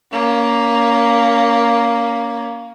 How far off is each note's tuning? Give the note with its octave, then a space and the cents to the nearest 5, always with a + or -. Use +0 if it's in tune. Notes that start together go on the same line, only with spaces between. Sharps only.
A#3 +5 C#4 +30